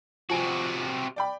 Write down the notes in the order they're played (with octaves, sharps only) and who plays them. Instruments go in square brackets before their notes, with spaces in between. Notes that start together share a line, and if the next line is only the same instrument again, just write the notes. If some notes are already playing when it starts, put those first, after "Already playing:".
[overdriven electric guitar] C3 F#4 [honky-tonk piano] F3 G#5 D7
[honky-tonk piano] D5 G5 B5